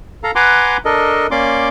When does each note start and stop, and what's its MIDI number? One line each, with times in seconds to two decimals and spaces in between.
0.24 0.31 69
0.24 0.31 77
0.24 0.31 82
0.35 0.77 71
0.35 0.77 78
0.35 0.77 80
0.35 0.77 82
0.35 0.77 84
0.35 0.77 86
0.85 1.27 62
0.85 1.27 69
0.85 1.27 70
0.85 1.27 75
1.31 1.69 58
1.31 1.69 61
1.31 1.69 74
1.31 1.69 84
1.31 1.69 86